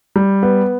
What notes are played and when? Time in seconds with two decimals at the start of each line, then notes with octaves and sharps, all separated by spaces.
0.16 G3
0.43 B3